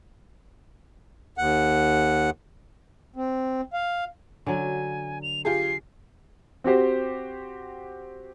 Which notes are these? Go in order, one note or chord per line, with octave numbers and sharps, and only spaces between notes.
D#2 F#5
C4
F5
D3 F#3 G#5
F7
F4 G4 G#4 C7
C4 F#4 G4 C5